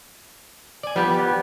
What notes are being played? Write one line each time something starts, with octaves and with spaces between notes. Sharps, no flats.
D5 G#5
F3 G3 B3 G4